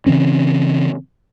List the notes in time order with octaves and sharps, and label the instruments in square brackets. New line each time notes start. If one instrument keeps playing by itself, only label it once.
[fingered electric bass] C#3 E3 C4 C#4